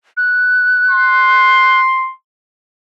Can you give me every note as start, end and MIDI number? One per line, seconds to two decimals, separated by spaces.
0.17 1.80 90
0.90 2.13 84